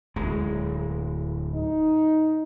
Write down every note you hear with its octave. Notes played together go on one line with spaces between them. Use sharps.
D1 G#3
D#4